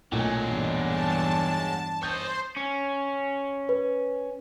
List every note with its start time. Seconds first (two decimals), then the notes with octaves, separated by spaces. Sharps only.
0.12 B1 A#2 F#3 G#3 A3 C#4
0.44 E2 G2 D4
0.84 A5
2.03 C5 C#5 D#5 G6
2.56 C#4
3.69 B4